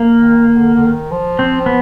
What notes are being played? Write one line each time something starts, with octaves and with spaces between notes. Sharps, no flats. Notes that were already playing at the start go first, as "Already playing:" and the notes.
Already playing: A#3
D#3
D#3
D3
D3
D#3
F3
C4
B3